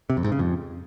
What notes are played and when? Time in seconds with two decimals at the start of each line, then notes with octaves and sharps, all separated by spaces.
0.10 C3
0.17 F2
0.24 G#2
0.32 C#3
0.39 F2